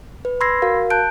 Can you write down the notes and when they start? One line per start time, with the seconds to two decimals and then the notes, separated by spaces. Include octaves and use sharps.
0.25 B4
0.41 B5 C6 E6 G#6 A#6 C7
0.62 F#4 A#4 F5
0.90 A5 F#6 G6 D7